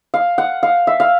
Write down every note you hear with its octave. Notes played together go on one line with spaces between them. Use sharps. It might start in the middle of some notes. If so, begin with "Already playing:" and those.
F5
F#5
F5
E5
F5